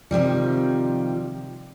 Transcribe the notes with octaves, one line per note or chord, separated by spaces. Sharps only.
C3 D#3 F3 G3